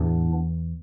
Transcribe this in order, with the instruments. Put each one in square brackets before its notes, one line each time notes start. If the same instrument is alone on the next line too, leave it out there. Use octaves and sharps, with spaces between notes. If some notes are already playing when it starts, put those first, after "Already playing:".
Already playing: [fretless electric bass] E2 [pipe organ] A2 E3 B3 D4